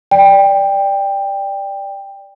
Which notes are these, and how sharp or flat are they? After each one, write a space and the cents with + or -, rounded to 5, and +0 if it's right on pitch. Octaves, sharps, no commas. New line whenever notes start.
D5 +0 G5 +15